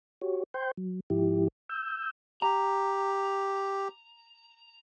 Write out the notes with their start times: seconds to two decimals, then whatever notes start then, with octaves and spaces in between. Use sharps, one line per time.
0.22 F#4 G4 C#5
0.54 C5 G5 C6 G6
0.77 F#3
1.10 G#2 F3 E4 G4
1.69 E6 G6
2.42 G4 A#5